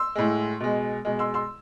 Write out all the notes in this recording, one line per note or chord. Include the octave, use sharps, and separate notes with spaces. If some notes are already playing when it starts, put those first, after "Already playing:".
Already playing: C6 E6
A2 G#3
B2 G#3
B2 G#3
C6 E6
C6 E6